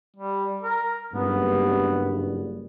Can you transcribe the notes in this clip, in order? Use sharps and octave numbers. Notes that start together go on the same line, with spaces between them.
G3
A#4
F#1 G2 B3